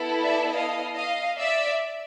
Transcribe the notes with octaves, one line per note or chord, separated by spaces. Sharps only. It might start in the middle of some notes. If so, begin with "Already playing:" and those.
Already playing: B3 E4 A4
D5 E5
D#5 F5
D#5 F5
D5 E5